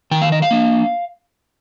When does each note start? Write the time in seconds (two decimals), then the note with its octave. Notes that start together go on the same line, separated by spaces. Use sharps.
0.11 D#3 G5
0.22 F5
0.32 D#5
0.42 F5
0.51 A#3 D4